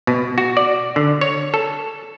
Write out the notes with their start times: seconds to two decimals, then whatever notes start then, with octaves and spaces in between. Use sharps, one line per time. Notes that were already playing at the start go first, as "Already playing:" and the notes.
0.07 B2
0.38 F#4
0.57 D5
0.96 D3
1.21 C#5
1.54 A4